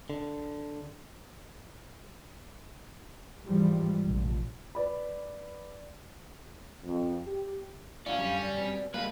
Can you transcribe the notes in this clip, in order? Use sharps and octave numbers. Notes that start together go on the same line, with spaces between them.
D3
G#2 E3 F3 G3 G#3
F1 A#1
B4 D5 B5
F2
G4
C#4 E4 F#4 D5 F5
F#2 D3 G3
D5
B2 C4
G3 G#3 A#3 B4 F5